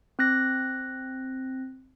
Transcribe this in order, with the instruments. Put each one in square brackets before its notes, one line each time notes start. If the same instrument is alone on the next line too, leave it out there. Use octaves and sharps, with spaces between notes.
[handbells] C4 F#6 A#6